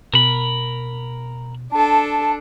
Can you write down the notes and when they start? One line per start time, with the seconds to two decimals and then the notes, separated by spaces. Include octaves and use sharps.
0.14 B2 A#4 B5
1.72 D4 A4 A5